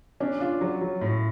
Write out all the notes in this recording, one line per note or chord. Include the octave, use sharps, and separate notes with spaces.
C#4 D4
D4 F4
F#3
F#3
A2